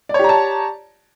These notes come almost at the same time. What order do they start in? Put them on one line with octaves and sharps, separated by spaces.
D5 C#5 G4 A#5 A5